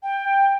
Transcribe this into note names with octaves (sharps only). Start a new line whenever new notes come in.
G5